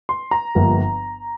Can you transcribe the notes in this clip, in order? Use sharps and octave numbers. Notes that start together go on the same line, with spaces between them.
C6
A#5
G1 G2 F3 A#3